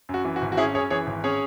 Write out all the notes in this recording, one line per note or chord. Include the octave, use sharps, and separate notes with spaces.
F#2
F#4
E3
F#4
G#1
F#4
C#4 E4 G#4
F#2 G#4 C#5
E3 G#4 C#5
G#1
C#4 G#4 C#5